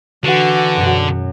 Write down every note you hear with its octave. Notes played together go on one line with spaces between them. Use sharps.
D3 E3 F#4
F#2 B2